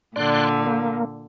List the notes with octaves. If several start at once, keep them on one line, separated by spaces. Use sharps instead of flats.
A#2 D3 D5 C6 F#6
A#3